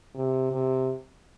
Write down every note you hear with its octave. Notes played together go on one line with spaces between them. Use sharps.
C3
C3